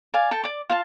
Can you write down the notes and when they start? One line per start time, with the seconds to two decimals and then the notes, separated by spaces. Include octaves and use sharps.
0.14 D5 F5 G#5
0.31 A4 G5 A5
0.44 D5 D6
0.70 F4 F5 A5